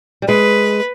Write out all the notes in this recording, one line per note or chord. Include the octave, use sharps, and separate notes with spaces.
G3
G#3 B4